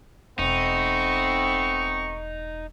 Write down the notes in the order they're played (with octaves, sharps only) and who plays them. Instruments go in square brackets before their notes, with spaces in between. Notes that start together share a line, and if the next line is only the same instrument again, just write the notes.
[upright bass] E1 [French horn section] A3 B3 C4 [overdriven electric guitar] D#4 [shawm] C#6